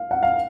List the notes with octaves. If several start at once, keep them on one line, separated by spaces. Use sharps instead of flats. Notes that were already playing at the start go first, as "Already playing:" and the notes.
Already playing: F5
F#5
F5